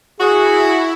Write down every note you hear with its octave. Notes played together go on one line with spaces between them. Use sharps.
E4 F#4 G#4